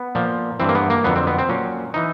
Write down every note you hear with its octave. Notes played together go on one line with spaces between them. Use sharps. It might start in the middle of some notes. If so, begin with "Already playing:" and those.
Already playing: B3
A#2 F3
G2 E3 C4
A#3
B3
A#3
F2 D3 F#3 B3
C4
B3
C4
A#2 F#3 C#4
E3 D#4